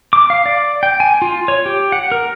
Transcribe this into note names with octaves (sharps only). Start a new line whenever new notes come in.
D6
F5
D5
G5
G#5
F4
C#5
G4
F#5
A#4